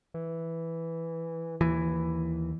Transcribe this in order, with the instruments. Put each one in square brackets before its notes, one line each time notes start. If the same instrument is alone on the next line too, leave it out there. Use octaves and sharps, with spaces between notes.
[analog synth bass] E3
[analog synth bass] D#2 [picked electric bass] E3